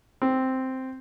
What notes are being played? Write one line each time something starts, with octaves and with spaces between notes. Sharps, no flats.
C4